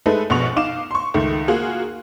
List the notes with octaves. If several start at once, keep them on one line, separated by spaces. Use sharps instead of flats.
G#3 A3 D#4 A4 B4
A#1 B2 B3 F#5 C#6 F7
D#4 F5 D6 E7
C6 C#6
C#2 D#3 A3
A#3 F4 F#4 G#4